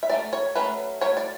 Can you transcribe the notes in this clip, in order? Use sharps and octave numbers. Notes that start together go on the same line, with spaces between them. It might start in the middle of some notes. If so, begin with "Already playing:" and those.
E5
F#3 A3 C#4 D5
C#5
F#3 A3 C#4 B4
F#3 A3 C#5
D5